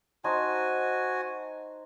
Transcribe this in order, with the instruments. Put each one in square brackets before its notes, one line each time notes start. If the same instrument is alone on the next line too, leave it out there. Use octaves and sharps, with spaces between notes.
[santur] D#4 C5 A5 [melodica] F#4 G#5